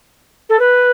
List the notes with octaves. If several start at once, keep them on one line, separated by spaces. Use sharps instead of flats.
A4
B4